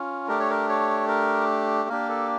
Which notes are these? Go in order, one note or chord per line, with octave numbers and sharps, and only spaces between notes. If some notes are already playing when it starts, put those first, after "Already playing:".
Already playing: C#4 F4
A3 D4 G4 A#4
C#5
A#4
C#5
A#4
A#3 D4 G4 A#4
A4